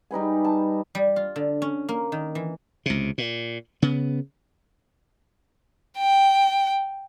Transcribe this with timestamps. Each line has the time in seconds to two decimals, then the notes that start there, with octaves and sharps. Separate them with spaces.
0.11 G3 D#4 B4 G#5
0.45 A5
0.95 G3
1.16 F4
1.36 D3
1.62 C#4
1.89 A#3
2.12 D#3
2.35 E3
2.86 C#2 C3
3.18 A#2
3.82 C#3 B3
5.99 G5